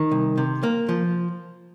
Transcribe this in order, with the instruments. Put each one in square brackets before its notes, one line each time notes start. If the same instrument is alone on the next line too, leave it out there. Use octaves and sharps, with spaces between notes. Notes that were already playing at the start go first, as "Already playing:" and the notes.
Already playing: [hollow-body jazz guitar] D#3
C2
C3
A#3
F3